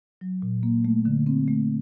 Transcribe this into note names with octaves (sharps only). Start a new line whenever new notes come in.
F#3
A#2
A#3
A3
D3
C4
A3